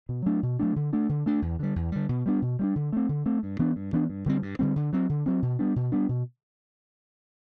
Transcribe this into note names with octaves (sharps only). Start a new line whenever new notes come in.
B2
F#3 A3 D4
B2
F#3 A3 D4
D3
A3 D4
D3
A3 D4
E2
D3 G3
E2
D3 G3
B2
G3 B3 D4
B2
G3 B3 D4
D3
A3 C4
D3
A3 C4
G2
E3 B3 D4
G2
E3 B3 D4
G2
D3 G3 C4
G2
D3 G3 C4
D3
F#3 C4
D3
F#3 C4
B2
G3 B3 D4
B2
G3 B3 D4
B2